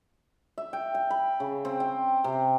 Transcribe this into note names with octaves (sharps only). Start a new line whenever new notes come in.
E5
G5
G5
B5
C#3
C4
G5
C3